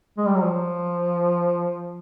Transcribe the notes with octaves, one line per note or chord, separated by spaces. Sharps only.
G#3
G3
F#3
F3